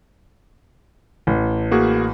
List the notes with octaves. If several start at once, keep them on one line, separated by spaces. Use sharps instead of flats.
A1
A#3 F#4 G#4